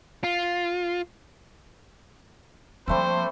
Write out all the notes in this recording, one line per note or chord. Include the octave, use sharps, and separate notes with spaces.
F4
F3 G3 A3 A#3 C4 C5